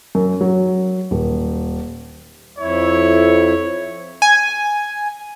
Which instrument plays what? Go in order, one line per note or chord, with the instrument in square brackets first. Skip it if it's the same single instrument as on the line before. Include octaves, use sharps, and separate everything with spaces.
[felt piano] F#2
F#3
D#1
[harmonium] F2 E4 [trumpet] C#5
[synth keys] G#5